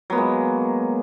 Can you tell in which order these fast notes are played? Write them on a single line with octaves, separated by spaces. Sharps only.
F#3 B3 A#3 G#3